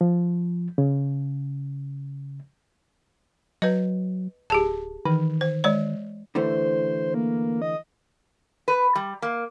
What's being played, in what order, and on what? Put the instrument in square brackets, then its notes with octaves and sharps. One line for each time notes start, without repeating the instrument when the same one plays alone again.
[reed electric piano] F3
C#3
[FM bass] F#3 [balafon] B4 D#5
[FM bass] D1 [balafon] G4 G#4 A5
[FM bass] D#3 [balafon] E3
[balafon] C5
G#3 C#5 D5
[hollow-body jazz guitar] D3 E3 A3 [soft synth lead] C5
[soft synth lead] A#3
D#5
[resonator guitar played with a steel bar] B4
G3
A#3